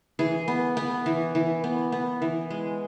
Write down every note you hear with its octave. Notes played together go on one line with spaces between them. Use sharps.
E3 G#4
B3
B3
E3
E3
B3
B3
E3
G#3